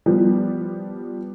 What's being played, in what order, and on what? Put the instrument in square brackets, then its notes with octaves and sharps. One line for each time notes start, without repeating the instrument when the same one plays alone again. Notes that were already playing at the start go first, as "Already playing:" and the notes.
[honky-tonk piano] F3 G3 B3